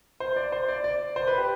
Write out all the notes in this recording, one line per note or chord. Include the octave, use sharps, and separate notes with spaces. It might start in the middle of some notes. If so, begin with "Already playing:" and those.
C5
D5
C5
D5
D5
C5
B4
G4